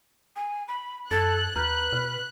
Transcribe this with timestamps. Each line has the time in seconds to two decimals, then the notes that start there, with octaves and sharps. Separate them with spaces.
0.36 G#5
0.68 B5
1.11 F#2 A4 F#6 G#6 A6
1.56 D#2 B4 A#5 F6 G6
1.93 B2 F6